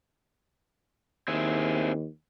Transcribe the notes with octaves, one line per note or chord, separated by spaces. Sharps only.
D#2 C4 E4 G#4